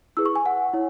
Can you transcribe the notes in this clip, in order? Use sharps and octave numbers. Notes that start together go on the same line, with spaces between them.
E4 G#4 B4 E6
C#6
G#5
F#5
E4 C#5